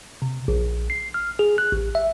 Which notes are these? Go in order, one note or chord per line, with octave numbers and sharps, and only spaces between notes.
C3
A#1
C7
F6
G#4
F#6
A1
E5